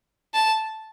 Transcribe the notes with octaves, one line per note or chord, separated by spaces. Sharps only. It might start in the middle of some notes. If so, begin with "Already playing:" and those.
A5